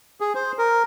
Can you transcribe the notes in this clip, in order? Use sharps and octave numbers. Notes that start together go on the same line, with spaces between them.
G#4
C5
A#4